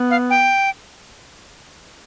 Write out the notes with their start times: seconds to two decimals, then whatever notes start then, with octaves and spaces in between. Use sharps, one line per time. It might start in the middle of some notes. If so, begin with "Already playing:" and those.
Already playing: B3
0.11 F5
0.30 G5